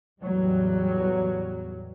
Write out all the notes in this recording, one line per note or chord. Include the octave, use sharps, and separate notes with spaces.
E2 A2 F#3 G3